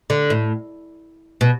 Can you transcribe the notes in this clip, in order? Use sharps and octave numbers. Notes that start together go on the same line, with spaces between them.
D3
A2
B2